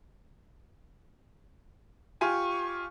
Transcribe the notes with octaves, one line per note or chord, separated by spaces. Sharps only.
F4 G4 G#5 C#6